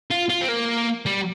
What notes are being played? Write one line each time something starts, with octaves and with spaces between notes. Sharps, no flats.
F4
F4
C4
A#3
G3